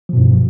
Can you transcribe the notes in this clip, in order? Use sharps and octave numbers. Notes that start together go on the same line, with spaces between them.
G2 B2 F3